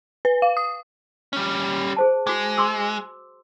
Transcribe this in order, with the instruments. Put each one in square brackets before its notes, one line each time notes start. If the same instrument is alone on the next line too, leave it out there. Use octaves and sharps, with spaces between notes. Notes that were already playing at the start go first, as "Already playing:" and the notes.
[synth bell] B4
F5
D#6
[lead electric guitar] G3 C#4
[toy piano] G#4 C5 A5
[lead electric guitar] G#3 [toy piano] F#4 D6
[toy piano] C6 D6 E6